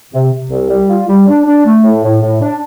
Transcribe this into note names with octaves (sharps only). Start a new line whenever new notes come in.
C3
C3
C2
G3
F4
G3
D4
D4
A3
A2
A2
A2
D4